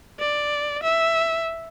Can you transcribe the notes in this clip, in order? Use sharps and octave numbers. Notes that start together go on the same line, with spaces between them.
D5
E5